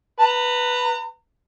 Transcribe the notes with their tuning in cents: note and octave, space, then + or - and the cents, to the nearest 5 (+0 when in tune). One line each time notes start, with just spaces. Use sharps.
B4 +0 A#5 -35